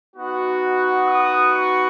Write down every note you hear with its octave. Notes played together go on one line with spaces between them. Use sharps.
B3 D#4 F#4
D#6
C#6